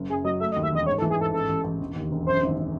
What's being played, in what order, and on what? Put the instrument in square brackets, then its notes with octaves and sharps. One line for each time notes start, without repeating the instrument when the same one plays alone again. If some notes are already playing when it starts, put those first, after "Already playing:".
Already playing: [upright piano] F#1
[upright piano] F#2 [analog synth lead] G#4
[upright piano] F#3 [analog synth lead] D#5
[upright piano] A3 [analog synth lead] E5
[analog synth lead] D#5
[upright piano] D#2
[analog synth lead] E5
[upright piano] E1 [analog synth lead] D#5
[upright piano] G#2 [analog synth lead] C#5
[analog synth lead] A4
[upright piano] E3
[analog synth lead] G#4
[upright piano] G#2 [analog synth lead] A4
[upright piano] A1 [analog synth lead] A4
[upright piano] A1
A1
E1
D#2
E1
[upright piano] F#2 [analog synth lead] C5
[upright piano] G#1